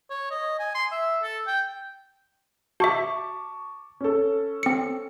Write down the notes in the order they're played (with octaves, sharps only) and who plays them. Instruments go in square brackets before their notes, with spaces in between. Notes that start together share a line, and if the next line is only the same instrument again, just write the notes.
[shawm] C#5
D#5
G#5
C6
E5
A4
G5
[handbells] F#4 E5 [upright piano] A5 C#6 D6
[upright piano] C#4 A4
[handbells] C4 C#7